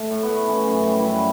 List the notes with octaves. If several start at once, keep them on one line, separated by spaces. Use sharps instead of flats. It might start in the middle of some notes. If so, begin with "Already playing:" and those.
Already playing: A3
A2
B3
A3
E3 C#4
F#2
G3
E3 E4
F#2